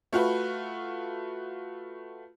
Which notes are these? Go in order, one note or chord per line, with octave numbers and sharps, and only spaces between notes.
A3 F4 F#4 B4